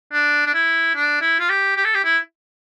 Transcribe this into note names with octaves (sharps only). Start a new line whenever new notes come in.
D4
D4
E4
D4
E4
F4
G4
G4
A4
G4
E4